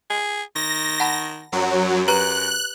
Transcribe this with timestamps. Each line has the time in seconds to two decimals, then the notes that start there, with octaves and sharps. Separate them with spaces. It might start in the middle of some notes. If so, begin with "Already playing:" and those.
0.10 G#4
0.56 D#3 A#6
1.00 F#5 A5 B5
1.53 F#2 F#3
2.08 G4 B4 A#5 F#6